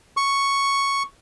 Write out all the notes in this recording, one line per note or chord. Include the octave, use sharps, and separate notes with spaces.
C#6